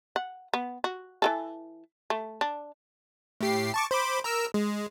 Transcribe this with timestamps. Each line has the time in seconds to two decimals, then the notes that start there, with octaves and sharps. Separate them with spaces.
0.16 F#5
0.54 B3
0.84 F#4
1.22 E3 G3 A4
2.10 A3
2.41 D4
3.41 A2 G4 C7
3.74 A5 C#6 D6
3.91 C5 B5 D6
4.24 A#4 A#5 E6
4.54 G#3